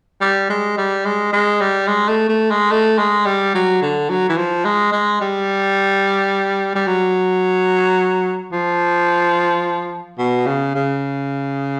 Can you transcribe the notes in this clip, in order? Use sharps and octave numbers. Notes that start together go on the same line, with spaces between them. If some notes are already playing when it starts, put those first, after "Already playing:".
G3
G#3
G3
G#3
G#3
G3
G#3
A3
A3
G#3
A3
G#3
G3
F#3
D3
F#3
E3
F3
G#3
G#3
G3
G3
F#3
F3
B2
C#3
C#3